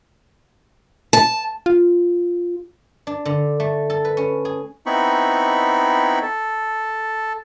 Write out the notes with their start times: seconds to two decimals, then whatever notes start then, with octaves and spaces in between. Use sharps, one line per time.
1.13 A5
1.66 F4
3.07 D4
3.25 D3
3.60 A3
3.90 A4
4.05 B4
4.17 C#4
4.45 G#4
4.86 B3 C4 D#4 E4 B5 C#6
6.22 A4